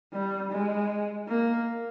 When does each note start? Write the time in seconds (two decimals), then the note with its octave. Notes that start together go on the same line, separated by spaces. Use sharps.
0.13 G3
0.51 G#3
1.28 A#3